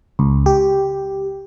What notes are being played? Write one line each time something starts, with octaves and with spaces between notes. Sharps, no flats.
C#2
G4